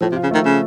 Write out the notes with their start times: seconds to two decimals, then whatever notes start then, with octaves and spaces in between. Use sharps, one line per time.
0.01 A2 F3
0.12 C3
0.15 F4
0.23 C#3
0.31 D#3 A3
0.45 C#3